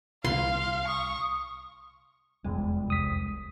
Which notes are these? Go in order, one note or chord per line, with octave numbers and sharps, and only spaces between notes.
C2 F5 C6
C#6 D#6
F1 E2 G3 G#3
C2 D#6 B6